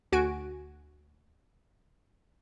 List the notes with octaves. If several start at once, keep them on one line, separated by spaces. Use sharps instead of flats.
D2 F#4 G#5 D7